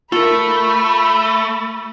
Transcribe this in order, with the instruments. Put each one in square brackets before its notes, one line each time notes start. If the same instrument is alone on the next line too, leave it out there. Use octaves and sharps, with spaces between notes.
[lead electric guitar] A3 [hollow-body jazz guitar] F4 A#4 [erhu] B5